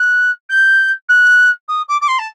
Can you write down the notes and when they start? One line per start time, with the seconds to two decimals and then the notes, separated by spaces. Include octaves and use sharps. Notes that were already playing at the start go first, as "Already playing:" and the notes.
Already playing: F#6
0.49 G6
1.09 F#6
1.68 D#6
1.88 D6
2.01 D6
2.08 C6
2.19 A5